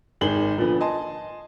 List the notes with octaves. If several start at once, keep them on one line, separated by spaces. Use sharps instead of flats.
G#1 D#3 G#4 F#7 G7
A#2 D3 F3 B3
D#5 G#5 A5 C6